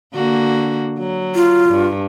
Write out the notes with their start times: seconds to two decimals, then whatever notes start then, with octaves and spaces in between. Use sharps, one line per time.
0.14 D3 A#3 F#4
0.99 F#3
1.35 F4
1.70 G2